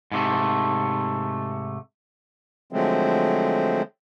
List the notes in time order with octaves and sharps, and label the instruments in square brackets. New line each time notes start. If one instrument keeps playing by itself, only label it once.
[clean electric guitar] G#2 C3 A3
[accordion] D3 F3 F#3 G#3 A3 C4